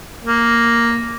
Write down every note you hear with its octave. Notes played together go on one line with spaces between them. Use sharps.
A#3